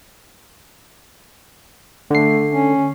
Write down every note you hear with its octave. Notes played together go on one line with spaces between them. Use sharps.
D3 A3 C7
C#4